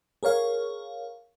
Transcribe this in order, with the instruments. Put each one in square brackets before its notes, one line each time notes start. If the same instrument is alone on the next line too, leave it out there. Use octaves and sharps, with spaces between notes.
[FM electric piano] G#4 A#4 C#5 F5